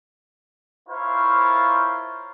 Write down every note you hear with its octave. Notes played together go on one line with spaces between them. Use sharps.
E4 F4 A#4 C5 C#5 F5